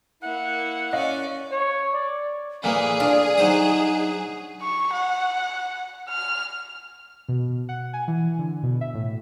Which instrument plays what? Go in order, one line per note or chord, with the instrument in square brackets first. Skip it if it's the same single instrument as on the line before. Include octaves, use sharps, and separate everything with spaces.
[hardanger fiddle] A#3 [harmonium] E4 [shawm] F#5
[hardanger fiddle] C#4 D5 [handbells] D#5 F5
[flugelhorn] C#5
D5
[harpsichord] A#2 E3 A#3 [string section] G#4 [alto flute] A4
[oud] D4 [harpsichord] F4
[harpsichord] F#3 C5 D#6 [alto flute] D#4
[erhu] C#6
F#5
F6
[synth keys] B2
F#5
G#5
E3
D3
B2
E5
A2